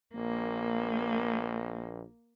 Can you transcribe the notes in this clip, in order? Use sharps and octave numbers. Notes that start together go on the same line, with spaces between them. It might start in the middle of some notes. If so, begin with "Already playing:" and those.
A#1 A#3